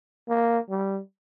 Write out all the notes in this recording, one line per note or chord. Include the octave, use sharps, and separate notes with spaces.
A#3
G3